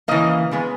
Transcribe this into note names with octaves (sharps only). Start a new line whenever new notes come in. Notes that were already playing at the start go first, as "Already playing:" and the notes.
C#3 E3 A#3 D#5
C#3 G#3 B3